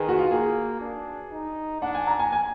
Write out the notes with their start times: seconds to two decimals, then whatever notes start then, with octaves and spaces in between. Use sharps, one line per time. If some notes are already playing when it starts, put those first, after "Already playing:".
Already playing: D#3 G#4 B4
0.09 F#4
0.19 F4
0.31 A#3 G#4
0.81 D4
1.31 D#4
1.82 D4 F#5
1.95 G#5
2.07 A#5
2.19 G#5
2.32 G#5